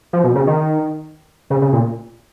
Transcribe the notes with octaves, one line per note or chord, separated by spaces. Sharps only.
F3
B2
C#3
D#3
C#3
C#3
A#2